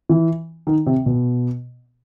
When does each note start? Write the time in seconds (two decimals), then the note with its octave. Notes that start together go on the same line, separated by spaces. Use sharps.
0.09 E3
0.67 D#3
0.86 C3
1.06 B2